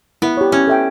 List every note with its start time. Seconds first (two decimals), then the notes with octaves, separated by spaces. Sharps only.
0.22 B3 E4
0.37 G4 C#5
0.52 C#4 E4
0.68 A4 E5 G5